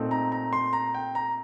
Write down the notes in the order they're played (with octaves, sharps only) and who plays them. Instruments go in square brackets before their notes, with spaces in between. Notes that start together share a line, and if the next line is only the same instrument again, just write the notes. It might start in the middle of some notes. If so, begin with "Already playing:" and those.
Already playing: [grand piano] A#2 A3 C4 D#4
A#5
A#5
C6
A#5
G5
A#5